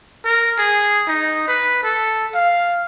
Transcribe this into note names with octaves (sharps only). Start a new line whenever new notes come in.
A#4
G#4
D#4
B4
A4
F5